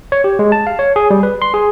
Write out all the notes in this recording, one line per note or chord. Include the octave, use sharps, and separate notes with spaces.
C#5
G4
G#3
A5
F5
C#5
G#4
G3
B4
C6
G#4